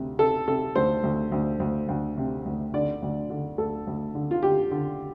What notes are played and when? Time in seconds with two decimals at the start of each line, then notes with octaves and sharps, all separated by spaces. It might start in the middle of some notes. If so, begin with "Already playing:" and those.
Already playing: D2 C3
0.19 C3 A4
0.48 C3 A4
0.76 D2 C5
1.03 D2
1.32 D2
1.60 D2
1.88 D2
2.17 C3
2.45 D2
2.74 D3 D5
3.02 D2
3.30 D3
3.58 D2 A4
3.87 D2
4.15 D3
4.31 F4
4.43 D3 G4
4.71 D3